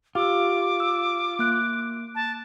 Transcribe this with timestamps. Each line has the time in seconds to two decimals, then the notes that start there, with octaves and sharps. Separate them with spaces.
0.15 F4 G4 D6 E6
0.80 E6
1.39 A#3 F#6 D7
2.15 A5